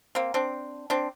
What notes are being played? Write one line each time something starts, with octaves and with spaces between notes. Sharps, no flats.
A#3 C4
C4 D4
C4 D4